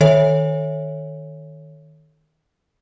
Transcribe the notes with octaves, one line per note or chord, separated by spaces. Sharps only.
D#3 A4 C#5 E5